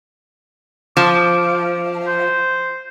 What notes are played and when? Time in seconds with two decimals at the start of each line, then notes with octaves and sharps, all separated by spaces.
0.97 F3 D6
2.07 C5